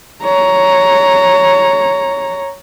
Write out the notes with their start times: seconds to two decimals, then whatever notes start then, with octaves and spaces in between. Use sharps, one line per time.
0.23 C#5 A#5